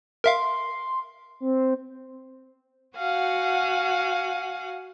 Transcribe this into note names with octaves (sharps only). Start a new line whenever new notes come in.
A#4 E5 F5 C6
C4
F#4 F5 F#5 G#5